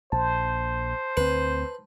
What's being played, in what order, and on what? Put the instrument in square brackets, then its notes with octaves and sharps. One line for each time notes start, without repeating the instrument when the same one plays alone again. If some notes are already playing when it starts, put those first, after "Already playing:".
[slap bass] A#1 [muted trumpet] C5 [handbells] A5
[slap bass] D2 C4 [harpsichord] B4